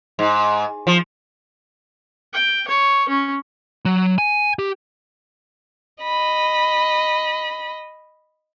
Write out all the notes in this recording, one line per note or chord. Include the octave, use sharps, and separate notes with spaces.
G#2
F3
G5
C#5
C#4
F#3
G#5
G4
D#5 B5